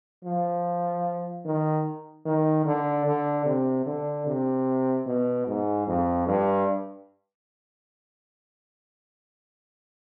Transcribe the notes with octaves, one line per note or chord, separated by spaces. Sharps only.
F3
D#3
D#3
D3
D3
C3
D3
C3
B2
G#2
F2
G2